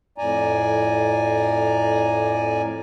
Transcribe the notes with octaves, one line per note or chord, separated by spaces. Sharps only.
F2 A2 D5 G#5 A#5